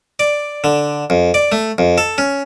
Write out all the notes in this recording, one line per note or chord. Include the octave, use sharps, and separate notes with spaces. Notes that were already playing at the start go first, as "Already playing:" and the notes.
D5
D3
F2
D5
A3
F2
A4
C#4